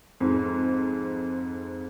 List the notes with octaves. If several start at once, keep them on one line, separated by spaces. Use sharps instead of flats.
F2 G#2